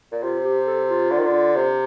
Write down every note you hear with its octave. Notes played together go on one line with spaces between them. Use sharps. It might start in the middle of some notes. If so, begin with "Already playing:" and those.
A#2
C3 F4
G4
A4
F4
D3
D#3
D3
C3